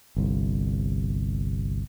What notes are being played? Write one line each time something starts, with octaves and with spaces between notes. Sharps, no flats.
G1 C2